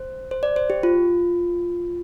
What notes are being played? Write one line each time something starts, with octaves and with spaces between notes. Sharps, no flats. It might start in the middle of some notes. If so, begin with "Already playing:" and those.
Already playing: C5
C5
D5
C5
G4
F4